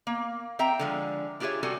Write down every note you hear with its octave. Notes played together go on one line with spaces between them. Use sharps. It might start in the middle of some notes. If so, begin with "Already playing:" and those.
A#3
C4 E5 G5 A#5
D3 F3 G#3
D4 F4 G4 G#4 C#5 E5
C3 G3 F#4 A4 G#5